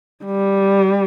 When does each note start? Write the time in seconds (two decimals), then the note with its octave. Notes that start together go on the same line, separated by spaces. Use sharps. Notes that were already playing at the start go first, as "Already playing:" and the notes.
0.25 G3